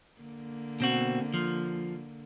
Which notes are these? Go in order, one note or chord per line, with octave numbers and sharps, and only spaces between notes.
D3 A#3
B2 C4 F#4
F3